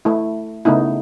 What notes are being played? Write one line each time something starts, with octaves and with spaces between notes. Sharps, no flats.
A3 E4
C#3 A3 B3 D#4 E4